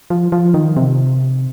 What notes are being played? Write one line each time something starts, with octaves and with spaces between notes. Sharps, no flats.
F3
F3
D#3
C3